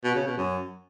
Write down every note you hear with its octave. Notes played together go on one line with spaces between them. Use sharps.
B2
C#3
B2
F#2